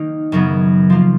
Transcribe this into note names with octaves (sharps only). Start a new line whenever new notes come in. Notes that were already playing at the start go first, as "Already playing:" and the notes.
Already playing: D#3 A#3 D#4
F#2 C#3 F#3 B3
F3 A#3 F4